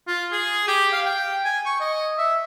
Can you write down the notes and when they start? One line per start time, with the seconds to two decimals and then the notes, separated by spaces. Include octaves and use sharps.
0.08 F4
0.32 G#4
0.68 G4
0.93 F5
1.05 G5
1.45 G#5
1.66 C#6
1.81 D#5
2.18 E5